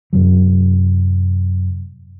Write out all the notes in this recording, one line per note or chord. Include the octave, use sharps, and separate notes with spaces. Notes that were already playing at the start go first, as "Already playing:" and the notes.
F#2 C3 F#3